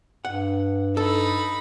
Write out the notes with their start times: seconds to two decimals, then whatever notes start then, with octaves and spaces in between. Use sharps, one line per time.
0.25 G2 F#5
0.97 D#4 A4 B5